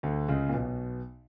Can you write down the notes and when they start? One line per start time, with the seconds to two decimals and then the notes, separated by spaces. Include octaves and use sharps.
0.03 D2 D3
0.28 C#2 C#3
0.49 A#2
0.54 B1 B2